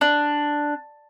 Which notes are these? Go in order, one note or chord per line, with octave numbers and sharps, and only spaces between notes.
D4